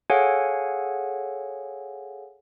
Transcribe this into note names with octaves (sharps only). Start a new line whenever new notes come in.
G#4 A4 C#5 F5 F#5 G#5